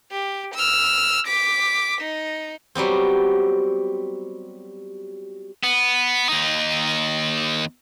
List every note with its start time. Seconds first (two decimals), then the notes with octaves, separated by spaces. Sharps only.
0.12 G4
0.54 E6 F6
1.27 D6 B6
2.01 D#4
2.75 F#3 G3 B3 C4
5.63 B3
6.29 D#2 D#4